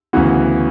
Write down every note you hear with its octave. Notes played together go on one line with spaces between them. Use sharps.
D2 C#3 E3 B3 F#4